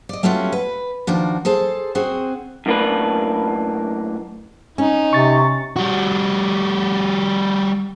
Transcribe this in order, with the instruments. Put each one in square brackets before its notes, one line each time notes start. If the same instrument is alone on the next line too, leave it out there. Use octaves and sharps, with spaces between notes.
[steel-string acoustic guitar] D5 D#5
G3 A3 B3 C#4 F4 F#4
B4
D#3 F3 D4 F#4
G#4 A4 C5 A5
C4 F#4 G#4 C5
[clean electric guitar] F#2 A2 A#3 D4 B4
[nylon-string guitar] C#4 [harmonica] D#4
[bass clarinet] C3 [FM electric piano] C#6 A6
[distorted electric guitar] G3 F#4